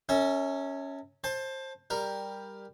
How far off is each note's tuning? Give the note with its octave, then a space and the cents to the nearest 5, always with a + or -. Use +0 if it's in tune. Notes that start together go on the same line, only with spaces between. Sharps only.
C#4 +0 A4 +45 E5 -35
C5 +20 A5 +0
G3 +10 A#4 +0